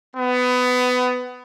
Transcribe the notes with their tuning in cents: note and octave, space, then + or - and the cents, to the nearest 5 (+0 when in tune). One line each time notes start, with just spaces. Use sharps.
B3 +20